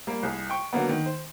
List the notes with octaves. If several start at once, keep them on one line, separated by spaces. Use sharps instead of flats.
G3 A#3
C2 G#4
G5 C#6
D3 F#3 A#3 B3
D#3
C5